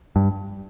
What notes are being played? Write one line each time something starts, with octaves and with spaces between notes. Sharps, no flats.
G2